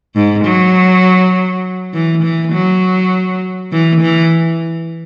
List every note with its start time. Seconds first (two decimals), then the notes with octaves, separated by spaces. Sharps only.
0.16 G#2
0.45 F#3
1.94 E3
2.24 E3
2.53 F#3
3.72 E3
4.01 E3